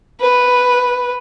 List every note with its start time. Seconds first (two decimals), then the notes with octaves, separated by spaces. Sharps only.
0.21 B4